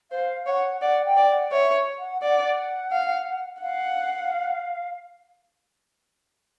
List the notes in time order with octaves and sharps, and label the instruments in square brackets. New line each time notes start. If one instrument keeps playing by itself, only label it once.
[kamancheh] C5 [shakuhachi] F5
[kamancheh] C#5 [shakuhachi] F#5
[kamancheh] D5 [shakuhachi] F#5
[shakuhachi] G5
[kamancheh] D5
[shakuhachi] G5
F#5
[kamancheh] C#5 [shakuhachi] E5
[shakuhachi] F#5
[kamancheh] D5 [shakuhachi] F#5
[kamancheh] F5
[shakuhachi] F5 [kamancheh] F#5